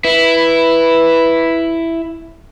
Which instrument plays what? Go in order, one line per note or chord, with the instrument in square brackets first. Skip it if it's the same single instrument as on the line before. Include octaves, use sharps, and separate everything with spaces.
[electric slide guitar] E4 [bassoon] B4